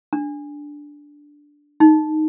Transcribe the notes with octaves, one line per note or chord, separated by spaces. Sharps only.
D4
D#4